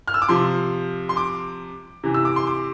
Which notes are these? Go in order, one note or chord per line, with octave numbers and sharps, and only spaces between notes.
F6
E6
D6
C3 F3 C6
C6
D6
C3 E3
E6
D6
C6
D6